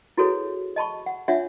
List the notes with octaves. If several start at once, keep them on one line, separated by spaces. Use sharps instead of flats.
E4 F#4 G#4 A4 B4 C#5
D#5 A5 B5 C#6
F#5
D4 F4 C#5 E5 F#5